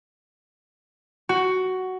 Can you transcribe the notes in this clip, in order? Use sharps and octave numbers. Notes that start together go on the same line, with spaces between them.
F#4